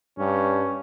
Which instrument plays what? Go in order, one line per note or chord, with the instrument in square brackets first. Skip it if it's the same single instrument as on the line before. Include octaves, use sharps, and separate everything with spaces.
[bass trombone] G2 [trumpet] C#4